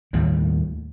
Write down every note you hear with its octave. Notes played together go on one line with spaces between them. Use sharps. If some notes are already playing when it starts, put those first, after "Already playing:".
D#2 A2 D#3 G3